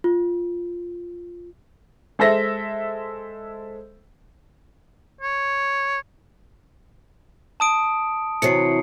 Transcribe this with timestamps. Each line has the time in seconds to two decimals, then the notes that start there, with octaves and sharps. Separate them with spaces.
0.04 F4
2.19 G#3 A4 C5 E5 A#6
5.21 C#5
7.60 A5 D#6 D7
8.42 C3 E3 F#3 C7 C#7